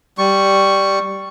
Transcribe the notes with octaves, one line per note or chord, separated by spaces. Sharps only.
G3 C#6